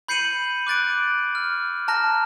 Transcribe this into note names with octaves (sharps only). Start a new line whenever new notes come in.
B5 G6 C7 C#7 D#7 F#7
D6 F#6 A6 D7
F6
A5 A#5 F6 A#6